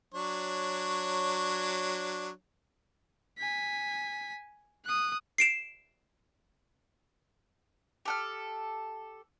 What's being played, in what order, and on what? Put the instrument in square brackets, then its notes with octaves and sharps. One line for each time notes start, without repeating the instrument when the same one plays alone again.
[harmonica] F#3 D4 C#5
[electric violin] G#5 B6
D#6 F#6
[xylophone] C7 D7 E7
[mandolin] G4 A4 F6